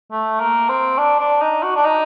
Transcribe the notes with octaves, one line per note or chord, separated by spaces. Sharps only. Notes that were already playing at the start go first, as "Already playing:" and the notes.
A3
A#3
C4
D4
D4
D#4
F#4
D4
D#4